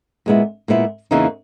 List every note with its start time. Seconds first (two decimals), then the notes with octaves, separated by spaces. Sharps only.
0.26 A#2 G#3 B3 E4
0.68 A#2 G#3 B3 E4
1.11 E2 C#3 E3 A#3 D#4